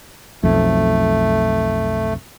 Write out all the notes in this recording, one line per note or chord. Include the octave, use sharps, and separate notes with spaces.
B1 F2 A3